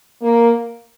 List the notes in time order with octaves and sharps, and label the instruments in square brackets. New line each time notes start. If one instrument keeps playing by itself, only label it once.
[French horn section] A#3